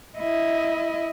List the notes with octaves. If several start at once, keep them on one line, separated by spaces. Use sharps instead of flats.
E4 D#5